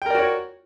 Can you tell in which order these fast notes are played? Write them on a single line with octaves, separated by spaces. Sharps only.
G5 A#4 D5 F#4 C#5